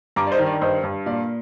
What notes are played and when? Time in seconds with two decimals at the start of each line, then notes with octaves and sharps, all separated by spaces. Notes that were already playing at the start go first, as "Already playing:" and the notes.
0.16 G2 A#5 D6
0.27 D5
0.32 C5 D#5
0.39 D#3
0.46 D5
0.61 G2 C5 D#5
0.83 G2
1.06 A#2 D5 F5